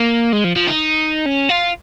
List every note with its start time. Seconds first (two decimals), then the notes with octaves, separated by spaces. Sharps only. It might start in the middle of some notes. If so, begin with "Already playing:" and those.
Already playing: A#3
0.33 G#3
0.44 F3
0.56 F3
0.67 D#4
1.26 C#4
1.49 F4